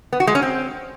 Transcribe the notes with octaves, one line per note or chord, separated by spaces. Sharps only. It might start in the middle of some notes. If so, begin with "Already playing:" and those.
B3
F#4
G#3
C#4
C4